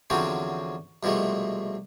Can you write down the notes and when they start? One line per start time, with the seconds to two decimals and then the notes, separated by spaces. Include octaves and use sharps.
0.10 E2 D3 F3 F#3 C4 C#4
1.03 C2 B2 F3 G#3 A3